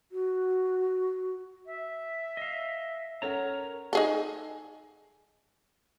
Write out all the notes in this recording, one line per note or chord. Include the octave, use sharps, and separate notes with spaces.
F#4
E5
D#5 F5
C#4 A4 A#4 C#5 F#5 A#5
D#4 G#4 A4